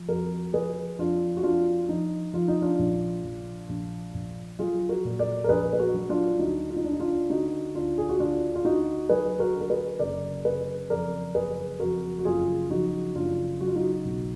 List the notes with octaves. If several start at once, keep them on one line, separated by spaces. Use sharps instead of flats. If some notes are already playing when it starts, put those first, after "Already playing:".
Already playing: F3
F2 F#4 A#4
F3 G#4 B4
F2 D4 F4
F#4
F2 D4 F4
F3 D#4
F3 F4
D#4
D4 F4
A#1
A#1
A#1
A#1
F#3 F4 G#4
F#4 A#4
A#2
A#4 D5
A#4
A#1 G#4 B4
B4
F#4 A#4
F#3
D4 F4
D2 D#4 F#4
F4
D#4
D3 D4
D#4
D4 F4
D3 D#4 F#4
D2 D4 F4
G#4
F#4
D2 D4 F4
F4
D2 D#4 F#4
F#3 G#4 B4
F#4 A#4
D3
A#4
G#4 B4
F#1 A#4 D5
F#1 G#4 B4
F2 A#4 D5
F#1 G#4 B4
F2 F#4 A#4
F#4
F#1 F4 G#4
F3 D#4 F#4
F#1 D4 F4
F#3 F#4
F4
D#4 F#4
B1